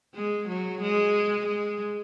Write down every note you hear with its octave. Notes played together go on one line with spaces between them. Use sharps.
G#3
F#3
G#3
G#3